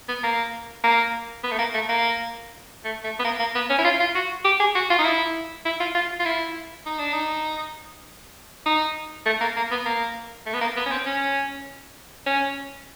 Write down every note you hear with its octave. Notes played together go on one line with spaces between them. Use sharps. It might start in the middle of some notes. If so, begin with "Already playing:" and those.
B3
A#3
A#3
B3
A3
A#3
A3
A#3
A3
A3
B3
A#3
A#3
B3
C#4
E4
F4
F4
F#4
G4
G#4
F#4
F4
D#4
E4
E4
F4
F4
F4
E4
D#4
D4
D#4
D#4
A3
A#3
A#3
B3
A#3
A3
B3
A#3
B3
C#4
C4
C#4
C#4